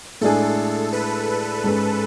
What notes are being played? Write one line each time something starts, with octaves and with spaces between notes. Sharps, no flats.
A2 G#3 D4 G#4 A4
B4
G#2 G#3 C#4